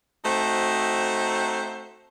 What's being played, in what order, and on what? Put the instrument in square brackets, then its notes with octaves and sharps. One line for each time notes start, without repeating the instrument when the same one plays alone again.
[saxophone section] A3 C4 D#4 F#4 C5